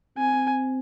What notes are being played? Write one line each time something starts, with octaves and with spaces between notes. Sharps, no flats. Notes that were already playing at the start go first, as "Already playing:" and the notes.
C4 G#5